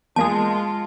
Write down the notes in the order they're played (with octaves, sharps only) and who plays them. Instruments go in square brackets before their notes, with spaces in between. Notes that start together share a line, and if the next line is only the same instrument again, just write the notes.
[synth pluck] E2 A#3 G#4 [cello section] G#3 F4 [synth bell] A5